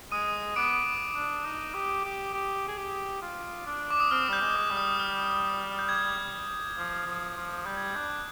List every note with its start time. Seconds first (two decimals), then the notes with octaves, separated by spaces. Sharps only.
0.12 G#3 D#6 D#7
0.56 B3 D6 D7
1.15 D4
1.45 D#4
1.74 G4
2.04 G4
2.34 G4
2.68 G#4
2.77 G4
3.22 F4
3.66 D4
3.91 D6
4.00 D#6
4.11 C4 F6
4.29 G3 G6
4.41 G#3
4.55 D6
4.70 G3
4.77 D#6
4.99 F6
5.79 G6
5.89 G#6
6.78 F3
7.06 F3
7.36 F3
7.66 G3 G6
7.77 G#6
7.88 G6
7.96 D4